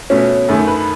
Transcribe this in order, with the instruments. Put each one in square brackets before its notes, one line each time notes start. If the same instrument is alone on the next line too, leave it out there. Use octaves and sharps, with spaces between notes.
[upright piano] B2 A3 C#4
F#2 D#3 A3
B4